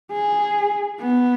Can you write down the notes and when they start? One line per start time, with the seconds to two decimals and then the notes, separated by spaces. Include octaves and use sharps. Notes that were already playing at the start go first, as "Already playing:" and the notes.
0.12 G#4
1.00 B3